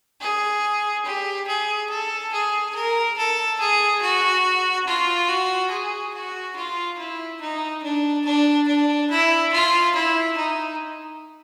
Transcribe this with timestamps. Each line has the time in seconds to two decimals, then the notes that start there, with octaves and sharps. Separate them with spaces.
0.21 G#4
1.05 G4
1.48 G#4
1.90 A4
2.33 G#4
2.75 A#4
3.17 A4
3.60 G#4
4.02 F#4
4.87 F4
5.29 F#4
5.71 G#4
6.14 F#4
6.56 F4
6.98 E4
7.41 D#4
7.83 D4
8.25 D4
8.67 D4
9.10 E4
9.53 F4
9.95 E4
10.37 D#4